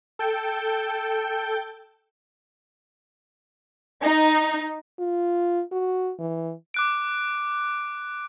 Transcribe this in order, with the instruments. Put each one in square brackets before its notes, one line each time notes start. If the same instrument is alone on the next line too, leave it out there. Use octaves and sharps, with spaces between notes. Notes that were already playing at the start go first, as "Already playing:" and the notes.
[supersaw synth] A4 G5 G6
[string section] D#4
[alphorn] F4
F#4
E3
[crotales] D6 F#6 D7